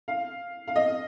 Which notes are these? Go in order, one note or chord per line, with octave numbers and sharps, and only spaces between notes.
F5
F5
D#5